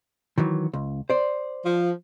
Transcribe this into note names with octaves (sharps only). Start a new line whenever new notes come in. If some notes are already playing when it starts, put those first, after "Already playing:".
D#3 E3 F#3
C#2
C5 D5
F3